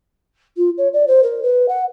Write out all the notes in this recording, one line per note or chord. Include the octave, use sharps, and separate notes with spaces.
F4
C#5
D5
C5
A#4
B4
F#5